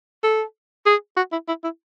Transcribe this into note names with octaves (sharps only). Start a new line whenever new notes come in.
A4
G#4
F#4
E4
E4
E4